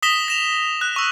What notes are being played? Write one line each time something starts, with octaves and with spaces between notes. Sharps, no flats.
D#6 A#6 B6 E7 G7
A#6 E7 F7
F#6
C#6 E6